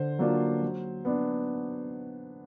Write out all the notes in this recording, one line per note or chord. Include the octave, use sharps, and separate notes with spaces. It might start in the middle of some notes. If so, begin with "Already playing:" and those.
Already playing: D3 C5
F#3 A#3 D4 F4
F#3
B3 D4